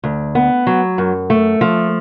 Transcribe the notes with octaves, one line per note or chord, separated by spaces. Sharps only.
D2
B3
F#3
F#2
A3
F3